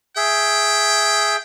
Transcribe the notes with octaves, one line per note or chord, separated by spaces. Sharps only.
G#4 E5 G5